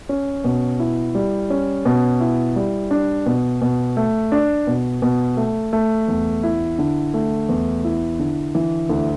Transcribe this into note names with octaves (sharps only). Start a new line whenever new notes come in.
C#4
B2
E4
G3
C#4
B2
E4
G3
D4
B2
B2
A3
D4
B2
B2
A3
A3
E2
E4
D3
A3
E2
E4
D3
E3
D2